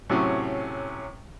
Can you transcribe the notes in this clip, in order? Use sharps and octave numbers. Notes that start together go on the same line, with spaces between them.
A2 C3 F#3 C#4